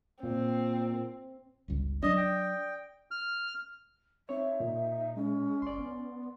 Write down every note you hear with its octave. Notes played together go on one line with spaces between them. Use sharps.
A#2 C4
G1 C#2
F#3 D4 D5 D#5 D#6 A#6
G5
F6
C4 D#4 C#5 E5
A#2
G#3 C#4
G1 D5 C6
B3